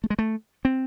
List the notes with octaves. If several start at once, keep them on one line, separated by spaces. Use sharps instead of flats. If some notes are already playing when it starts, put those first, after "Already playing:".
A3
G#3
A3
C4